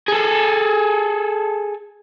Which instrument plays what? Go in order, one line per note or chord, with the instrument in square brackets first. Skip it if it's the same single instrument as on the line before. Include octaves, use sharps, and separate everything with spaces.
[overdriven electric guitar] G#4 A4